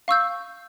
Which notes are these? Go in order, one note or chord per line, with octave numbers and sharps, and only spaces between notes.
F5 C#6 E6 G6